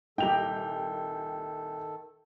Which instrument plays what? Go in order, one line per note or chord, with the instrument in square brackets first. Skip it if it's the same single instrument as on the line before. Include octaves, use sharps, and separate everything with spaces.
[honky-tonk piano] C2 A#2 [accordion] D#3 A4 [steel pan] D#4 G4 [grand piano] G5 F7